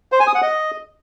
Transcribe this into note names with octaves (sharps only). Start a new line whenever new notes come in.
C5
G#5
D#6
F#5
D#5